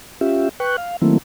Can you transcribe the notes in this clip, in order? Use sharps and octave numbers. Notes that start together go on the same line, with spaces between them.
C#4 F4 G4 E5
B4 G5 C#6 F#6
F5
D#3 F#3 A3 A#3 C4 E4